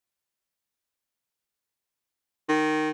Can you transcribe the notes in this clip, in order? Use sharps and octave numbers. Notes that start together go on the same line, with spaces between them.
D#3